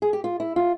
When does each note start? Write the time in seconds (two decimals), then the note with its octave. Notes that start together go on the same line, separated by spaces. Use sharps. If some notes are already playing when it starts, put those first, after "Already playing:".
0.02 G#4
0.13 G4
0.24 F4
0.40 E4
0.56 F4